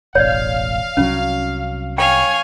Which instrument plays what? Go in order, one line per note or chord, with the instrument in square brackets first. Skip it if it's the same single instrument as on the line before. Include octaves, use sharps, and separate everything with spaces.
[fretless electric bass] E1 A1 [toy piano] C#5 D5 [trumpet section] F5
[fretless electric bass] C2 F#3 [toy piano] C#4
[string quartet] C#5 F5 G#5 [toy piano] G5